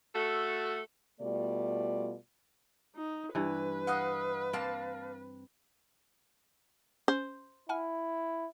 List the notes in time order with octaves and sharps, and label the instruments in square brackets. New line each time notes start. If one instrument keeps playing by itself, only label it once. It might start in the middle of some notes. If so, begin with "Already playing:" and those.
[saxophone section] A3 F#4 A4
[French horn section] B2 G3 A3 F4 D5
[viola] D#4
[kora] G2 E3 [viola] B4
[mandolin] D#5 F5 F#5
[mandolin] A#3 F5 A5 [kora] C4
[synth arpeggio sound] C#4 [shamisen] C5
[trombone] E4 [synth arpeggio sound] F#5 G#5 F6